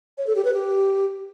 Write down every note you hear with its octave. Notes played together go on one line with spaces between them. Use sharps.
C#5
A4
G4
B4
G4